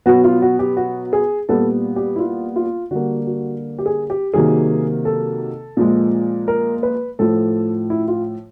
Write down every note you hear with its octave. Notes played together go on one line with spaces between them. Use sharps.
B2 F#3 B3 F#4
F4
F#4
G4
F#4
G#4
A#2 G3 B3 A4
G4
E4
F4
F4
D3 G3 A#3 F#4
F#4
G4
G#4
G4
C3 D#3 F#3 A#3 G#4
A4
A#2 F3 G#3
A#4
B4
A2 F3 A3 A4
E4
F4